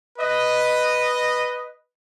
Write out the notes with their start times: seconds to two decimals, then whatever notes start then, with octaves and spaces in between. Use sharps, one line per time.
0.19 B4 D#5